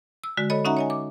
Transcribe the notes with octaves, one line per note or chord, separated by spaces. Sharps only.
E6
D3 G#3 F#4
A4 C#5 D#5 B5
C#4 D#4 F#4 E5 F#5 A#5
C#5 D#5 G#5
D6